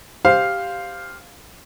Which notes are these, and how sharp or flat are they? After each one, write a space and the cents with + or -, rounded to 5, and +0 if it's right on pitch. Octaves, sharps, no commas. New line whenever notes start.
G4 +0 C5 -5 F5 +0